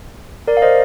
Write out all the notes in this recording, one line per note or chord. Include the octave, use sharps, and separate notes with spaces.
A#4 D5
F5
C5 D#5